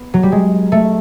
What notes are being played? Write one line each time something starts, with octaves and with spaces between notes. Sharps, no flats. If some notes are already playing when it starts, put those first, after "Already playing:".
Already playing: B3
F#3
G3
G#3
A3